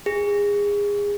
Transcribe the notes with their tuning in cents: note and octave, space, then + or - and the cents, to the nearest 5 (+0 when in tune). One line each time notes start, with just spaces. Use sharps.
G#4 -25